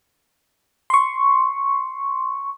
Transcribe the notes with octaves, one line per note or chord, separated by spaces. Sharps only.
C6 C#6